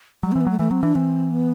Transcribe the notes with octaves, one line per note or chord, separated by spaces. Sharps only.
F#3 G3
C4
E3
B3
F#3 A3
E3 A3
F#3 C4
E3 D4
E3 C4
B3